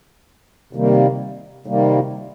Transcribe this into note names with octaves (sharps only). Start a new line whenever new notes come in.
C3 D#3 G3 A#3
C3 D#3 G3 A#3